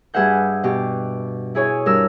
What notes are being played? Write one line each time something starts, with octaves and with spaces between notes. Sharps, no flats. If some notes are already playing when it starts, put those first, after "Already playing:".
G2 G#4 B4 E5 F#5 G6
B2 G4
E4 G#4 C#5
G2 A#4 E6